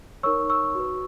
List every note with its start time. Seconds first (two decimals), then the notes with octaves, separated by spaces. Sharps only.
0.23 D#4 A#4 C#5 C#6 E6
0.50 C#6 E6
0.75 F#4 B4